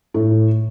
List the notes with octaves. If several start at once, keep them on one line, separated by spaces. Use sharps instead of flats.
A2